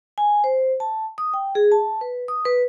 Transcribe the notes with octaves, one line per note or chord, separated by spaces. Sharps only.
G#5
C5
A5
D#6
G5
G#4
A5
B4
D#6
B4